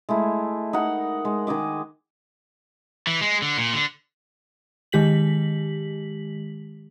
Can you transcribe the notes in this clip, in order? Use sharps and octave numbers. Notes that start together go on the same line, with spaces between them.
G#3 A3 E4
D#4 A#4 F#5
G#3
D#3 G#4 D#5 D6
E3
G#3
D3
A#2
D3
D#3 G#3 G4 B6 F#7